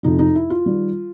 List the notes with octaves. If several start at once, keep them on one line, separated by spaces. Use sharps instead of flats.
F2 C3 F3 D#4
D#4
E4
F4
D#3 G3